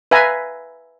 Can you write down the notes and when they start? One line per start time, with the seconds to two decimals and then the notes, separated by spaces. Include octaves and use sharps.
0.11 B4 E5 F5 G#5 A#5